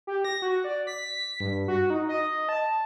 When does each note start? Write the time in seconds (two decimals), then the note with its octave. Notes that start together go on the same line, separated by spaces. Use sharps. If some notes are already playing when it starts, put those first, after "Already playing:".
0.07 G4
0.25 A#6
0.42 F#4
0.64 D5
0.87 B6
1.40 G2
1.68 F#4
1.90 D#4
2.09 D#5
2.49 A5